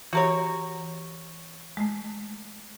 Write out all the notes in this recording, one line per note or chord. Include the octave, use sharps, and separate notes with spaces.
E3 F#4 G4 A#4 C#5
G#3 A3